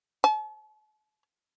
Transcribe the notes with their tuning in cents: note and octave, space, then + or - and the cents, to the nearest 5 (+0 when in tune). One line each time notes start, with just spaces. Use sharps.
A5 -45